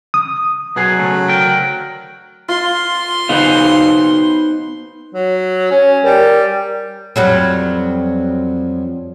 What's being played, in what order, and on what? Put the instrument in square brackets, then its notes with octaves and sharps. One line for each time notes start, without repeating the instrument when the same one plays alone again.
[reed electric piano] D#6
[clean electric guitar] B2 G#4 [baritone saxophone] F#3
[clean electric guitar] C#3 A3
D2 A#4 G5
[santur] F4 [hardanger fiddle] C6
[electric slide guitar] B3 D#4 F5 [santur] C5 F#5
[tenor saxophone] F#3
C#4
[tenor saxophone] G3 [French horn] A#4
[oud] F2 F#3 G3